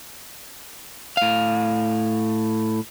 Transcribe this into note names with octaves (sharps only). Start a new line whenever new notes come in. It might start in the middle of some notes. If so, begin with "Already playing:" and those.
A2 F5